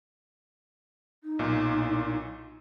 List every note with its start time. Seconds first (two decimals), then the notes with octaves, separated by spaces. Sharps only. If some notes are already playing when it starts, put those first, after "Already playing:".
1.24 D#4
1.39 B1 A#2